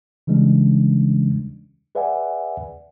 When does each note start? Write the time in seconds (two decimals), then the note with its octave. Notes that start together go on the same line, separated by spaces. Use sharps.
0.27 C#3 E3 G3 G#3 C#4 D4
1.95 G#4 B4 D5 E5 F#5 G#5